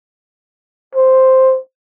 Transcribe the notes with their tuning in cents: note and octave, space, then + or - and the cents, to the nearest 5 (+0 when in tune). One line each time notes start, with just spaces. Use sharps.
C5 +0